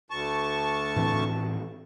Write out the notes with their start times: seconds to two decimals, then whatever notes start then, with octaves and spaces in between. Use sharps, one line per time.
0.11 D2 A5 C#6
0.96 A2 E3 C4